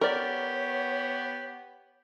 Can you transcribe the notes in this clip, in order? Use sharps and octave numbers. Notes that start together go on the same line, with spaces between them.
B3 G4 A#4 C#5 D5